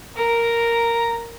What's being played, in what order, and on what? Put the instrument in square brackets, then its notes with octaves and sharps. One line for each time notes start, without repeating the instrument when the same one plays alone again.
[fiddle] A#4 [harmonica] A#5